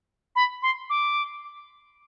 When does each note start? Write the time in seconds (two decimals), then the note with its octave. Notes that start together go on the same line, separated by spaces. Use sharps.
0.36 B5
0.62 C6
0.90 D6